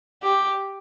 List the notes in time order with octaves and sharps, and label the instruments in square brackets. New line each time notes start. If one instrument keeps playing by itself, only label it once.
[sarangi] G4